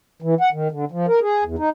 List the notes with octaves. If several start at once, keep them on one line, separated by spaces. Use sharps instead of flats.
E3
F#5
D#3
D3
F3
A#4
G#4
E2
D#4